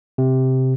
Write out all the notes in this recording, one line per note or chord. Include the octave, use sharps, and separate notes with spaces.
C3